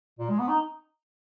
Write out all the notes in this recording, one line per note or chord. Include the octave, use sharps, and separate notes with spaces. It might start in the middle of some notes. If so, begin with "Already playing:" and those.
A#2
G#3
B3
D#4